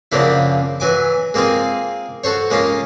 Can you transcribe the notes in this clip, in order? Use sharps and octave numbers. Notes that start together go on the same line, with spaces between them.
F#2 C#3 F3 A#3 D4 E4
E3 F#3 G#5 D6
G#3 A#3 C4 F4 G#4
F#4 A4 C5 C#5
G#3 A#3 C#4 F4